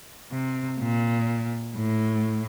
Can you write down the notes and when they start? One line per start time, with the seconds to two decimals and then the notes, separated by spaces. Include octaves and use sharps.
0.32 C3
0.80 A#2
1.76 A2